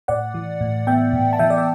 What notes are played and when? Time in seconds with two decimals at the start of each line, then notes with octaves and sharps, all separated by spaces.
0.08 A2 D5 F#5
0.34 E3
0.61 A2
0.87 B3 E5 G5
1.13 A2
1.33 A5
1.39 E3 E5 G5
1.50 D5
1.58 E5